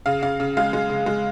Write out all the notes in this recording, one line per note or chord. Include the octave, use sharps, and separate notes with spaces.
C#3 F5
C#3 F5
C#3
G#3 F5
G#3
C#3
G#3